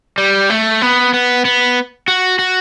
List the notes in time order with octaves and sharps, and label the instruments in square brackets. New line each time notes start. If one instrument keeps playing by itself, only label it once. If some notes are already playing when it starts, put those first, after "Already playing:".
[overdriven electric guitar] G3
A3
B3
B3
B3
F#4
F#4